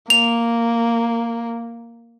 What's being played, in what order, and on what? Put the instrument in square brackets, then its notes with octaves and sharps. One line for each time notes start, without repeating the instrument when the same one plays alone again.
[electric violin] A#3 [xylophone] F7